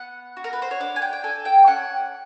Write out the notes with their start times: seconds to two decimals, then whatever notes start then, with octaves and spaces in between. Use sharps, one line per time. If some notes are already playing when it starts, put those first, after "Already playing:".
Already playing: B3 F#5
0.37 F#4
0.44 A#4
0.53 B4
0.62 C5
0.71 C#5
0.80 D4 D5
0.96 G#5
1.02 G5
1.13 G5
1.24 A4 G#5
1.45 G5
1.67 C#4 F#5